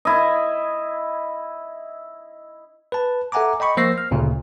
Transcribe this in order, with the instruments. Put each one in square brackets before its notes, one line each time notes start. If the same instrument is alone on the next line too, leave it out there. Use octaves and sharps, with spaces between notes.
[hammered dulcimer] E4 D#5
[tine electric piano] B4 A5
A4 E5 F#5 G#5 A#5 D6
D#5 G5 B5 C#6
F3 A#3 C5 E6 A#6 C7
F6
D2 A#2 C#3 A3